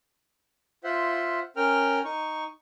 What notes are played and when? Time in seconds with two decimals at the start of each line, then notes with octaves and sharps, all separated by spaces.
0.84 F4 C5 E5 F#5
1.56 C#4 A#4 G5 F6
2.05 D#4 C#6